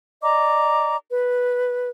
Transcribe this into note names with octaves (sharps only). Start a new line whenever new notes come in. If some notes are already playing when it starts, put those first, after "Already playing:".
D5 D#5 A#5 D6
B4